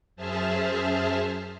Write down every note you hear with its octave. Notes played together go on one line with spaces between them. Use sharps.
F#2 G#4 C5 E5 A5 F6